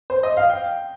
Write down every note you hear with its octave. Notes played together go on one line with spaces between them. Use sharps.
C5
D#5
F5
G5